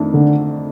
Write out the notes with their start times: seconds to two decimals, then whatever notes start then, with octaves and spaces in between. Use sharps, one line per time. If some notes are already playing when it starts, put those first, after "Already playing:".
Already playing: F2 D#3 A3 D4
0.14 D3